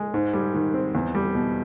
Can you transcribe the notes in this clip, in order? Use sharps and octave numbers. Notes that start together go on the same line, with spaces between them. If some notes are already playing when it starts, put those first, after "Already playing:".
Already playing: G#3
G#2
G3
D#3
C4
E2
G3
B2